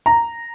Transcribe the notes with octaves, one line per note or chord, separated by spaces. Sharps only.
A#5